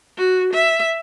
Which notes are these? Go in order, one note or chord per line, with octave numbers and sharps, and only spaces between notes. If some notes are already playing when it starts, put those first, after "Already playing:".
F#4
E5